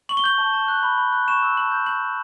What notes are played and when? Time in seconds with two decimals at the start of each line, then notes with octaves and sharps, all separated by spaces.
0.09 C#6 F#7
0.17 G7
0.24 G6 F#7
0.38 A5
0.53 A5
0.68 F#6
0.83 B5
0.98 B5
1.13 F#6
1.27 C#6 E7
1.42 E6
1.57 A5 F#7
1.72 G6
1.86 G6 F#7
2.01 C#6